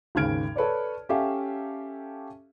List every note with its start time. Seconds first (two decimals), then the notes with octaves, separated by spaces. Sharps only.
0.15 G#1 D#2 C#3 F6 G#6 D7
0.56 A4 B4 C#5 D5
1.09 C#4 G4 A4 E5 F5